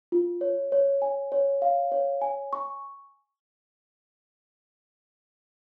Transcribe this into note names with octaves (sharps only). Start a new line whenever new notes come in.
F4
C#5
C#5
G#5
C#5
F5
C#5
G#5
C#6